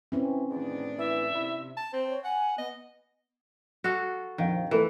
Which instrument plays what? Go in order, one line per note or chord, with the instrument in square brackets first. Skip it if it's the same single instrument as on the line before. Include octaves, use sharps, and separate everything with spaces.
[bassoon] E3 [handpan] C4 C#4
[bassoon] E2 [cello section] A2 D#3 D4
[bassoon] E3 [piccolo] E5
[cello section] C3 [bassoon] E4
[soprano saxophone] A5
[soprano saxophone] C4 [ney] C5
[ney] C#5
[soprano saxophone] F#5 [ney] G#5
[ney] B3 [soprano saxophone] D#5
[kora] F#4 A4 F5
[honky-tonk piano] A#1 F2 F5 [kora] D#3
[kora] E3 [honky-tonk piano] A3 A4 A#4